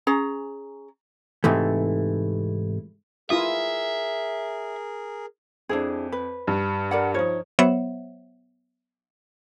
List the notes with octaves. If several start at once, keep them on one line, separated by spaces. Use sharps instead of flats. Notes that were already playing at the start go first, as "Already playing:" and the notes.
C#4 G#4 A#5
G#2 C3 E3 A3
E4 F4 G#4 A#4 E5 D#6
F2 D4 E4 G#4
B4
G2
A#4 D5 F#5
F3 D#4 C#5
F#3 B3 C5 C#5 E5 F#5